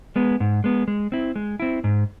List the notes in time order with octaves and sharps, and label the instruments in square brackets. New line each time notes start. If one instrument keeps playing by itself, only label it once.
[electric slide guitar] G#3 B3
G#2
G#3 B3
G#3
C4 E4
G#3
C4 E4
G#2